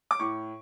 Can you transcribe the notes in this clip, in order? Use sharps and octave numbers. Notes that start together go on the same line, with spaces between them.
D6
A2 C#6